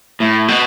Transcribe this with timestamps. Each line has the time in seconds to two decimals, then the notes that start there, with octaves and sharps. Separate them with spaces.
0.20 A2
0.48 B2